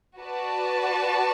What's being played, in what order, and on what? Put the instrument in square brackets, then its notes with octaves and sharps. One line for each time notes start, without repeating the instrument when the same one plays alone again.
[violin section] F#4 B4 D5 A5